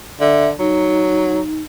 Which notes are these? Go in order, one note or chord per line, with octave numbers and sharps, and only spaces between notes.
D3 E5
F#3 D#4